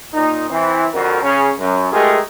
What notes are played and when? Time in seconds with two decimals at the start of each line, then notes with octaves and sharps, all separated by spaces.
0.13 A#2 D#4
0.49 E3 C4
0.93 F2 D3 F#4 A#4
1.23 C#3 C#4
1.59 F#2
1.92 G#3 A3 F4 G4 G#4 A#4